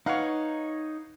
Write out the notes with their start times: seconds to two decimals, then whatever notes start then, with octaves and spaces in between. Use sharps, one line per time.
0.06 D#4 B4 C#5 F5 F#5